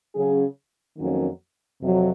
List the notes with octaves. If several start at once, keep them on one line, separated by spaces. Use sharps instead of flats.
C#3 F#3 C#4 G#4
F2 D#3 F#3 A#3 C#4
F2 C3 F#3